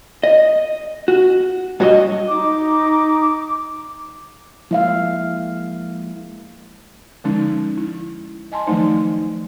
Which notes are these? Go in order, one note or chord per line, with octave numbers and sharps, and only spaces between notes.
D#5
F#4
G2 F#3 F#4 A4 D#5
D#4 D6
D6
F3 G#3 A#3 E4 E5 F5
D3 F3 G#3 C#4 D#4
E4
D#5 G#5 A5 C6
D#3 F3 F#3 A3 D#4 C5